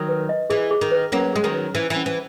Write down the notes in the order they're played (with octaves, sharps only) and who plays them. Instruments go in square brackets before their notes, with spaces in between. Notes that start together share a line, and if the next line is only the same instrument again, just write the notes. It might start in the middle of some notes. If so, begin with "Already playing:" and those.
Already playing: [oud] D#3 F#3
[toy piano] B4
D#5
[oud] E3 [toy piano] G#4
[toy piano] G#4
[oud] D#3
[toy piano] B4
[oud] F#3 A#3 [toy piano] C#4
[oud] G#3 [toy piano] G#4
[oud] D#3 F#3
[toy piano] B4
[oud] E3 [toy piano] C#4
[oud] E3
[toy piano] C#4
[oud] E3